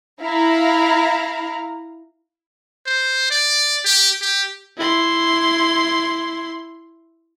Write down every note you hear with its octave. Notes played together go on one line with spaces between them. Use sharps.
E4 F5 A#5
C5
D5
G4
G4
E4 C6